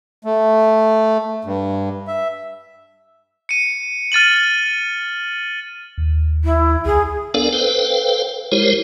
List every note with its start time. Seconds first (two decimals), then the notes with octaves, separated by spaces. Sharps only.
0.24 A3
1.45 G2
2.07 E5
3.49 C#7 D#7
4.12 F6 A6 D#7 F#7
5.98 D#2
6.44 E4
6.86 C#2 G#4
7.34 B3 D4 A4 A#4 D5 F5
7.53 A4 B4 C5 F5 G5
8.52 G#3 E4 G4 A#4 C5 C#5